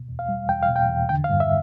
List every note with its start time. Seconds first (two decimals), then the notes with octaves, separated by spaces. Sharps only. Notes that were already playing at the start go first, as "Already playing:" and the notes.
Already playing: D2 B2
0.08 E2
0.19 F5
0.29 G3
0.49 E2 G5
0.63 F5
0.69 B2
0.76 G5
0.89 E2
1.09 D3 G5
1.24 F5
1.30 G2
1.40 E5